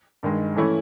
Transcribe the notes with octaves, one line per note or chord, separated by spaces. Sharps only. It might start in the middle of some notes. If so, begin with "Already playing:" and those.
G2 D#3 G#3
E3 A3 C#4 E4